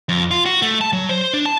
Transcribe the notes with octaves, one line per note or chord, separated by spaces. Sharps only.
F2
F4
F#4
A3
A5
F#3
C5
D4
A5